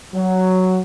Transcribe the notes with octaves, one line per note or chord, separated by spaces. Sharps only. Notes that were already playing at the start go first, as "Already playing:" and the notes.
F#3